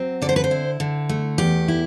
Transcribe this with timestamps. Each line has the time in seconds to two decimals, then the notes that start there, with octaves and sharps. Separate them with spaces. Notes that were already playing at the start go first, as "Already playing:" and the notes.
Already playing: F#3 C4
0.22 D3 D5
0.29 C5
0.36 B4
0.44 C5
0.51 E4
0.80 D3
1.09 A3
1.38 E2 G4
1.68 E4